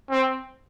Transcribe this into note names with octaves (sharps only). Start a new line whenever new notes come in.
C4